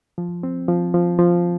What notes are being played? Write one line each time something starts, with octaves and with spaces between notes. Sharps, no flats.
F3
C4
F3
F3
F3